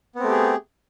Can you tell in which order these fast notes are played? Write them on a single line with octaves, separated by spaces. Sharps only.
B3 C4 A3 G4 G#4